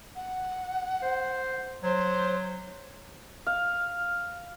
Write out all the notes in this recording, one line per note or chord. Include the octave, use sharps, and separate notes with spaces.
F#5
C5
F#3 C5
F5